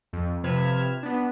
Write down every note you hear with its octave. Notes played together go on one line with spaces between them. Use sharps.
F2
C3 F3 B4 F6 G#6 E7
B3 D4